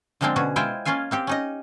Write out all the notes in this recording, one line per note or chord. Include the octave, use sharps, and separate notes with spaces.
D3 F3 G#3 A#3 C4 D4
B2 D3 C#4 F#4 G#4
G#3 E4 F4 C5 G5 G#5
A#3 C#4 F4 F5 G#5
A#3 C4 G4
C#4 D#4 D#5